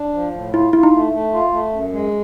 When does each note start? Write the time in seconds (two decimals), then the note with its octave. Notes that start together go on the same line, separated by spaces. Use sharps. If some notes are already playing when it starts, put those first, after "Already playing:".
Already playing: D4
0.14 F3
0.33 A2
0.53 E4 F4
0.73 E4 F4
0.83 D#4
0.93 A3
1.13 A3
1.33 F4
1.52 A3
1.73 F#2
1.92 G#3